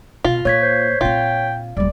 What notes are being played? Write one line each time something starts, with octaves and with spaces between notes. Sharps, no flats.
B2 F4 F5
A#2 C#5 G#6 B6
C5
A#2 C4 F4 G5
D#1 G3 D5